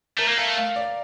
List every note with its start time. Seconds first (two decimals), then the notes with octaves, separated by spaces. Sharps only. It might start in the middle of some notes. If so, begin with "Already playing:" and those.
0.18 A3 A#4
0.28 A#3
0.38 A3 F5
0.57 F5
0.76 D5